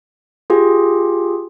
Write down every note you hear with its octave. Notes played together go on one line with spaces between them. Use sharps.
F4 G4 G#4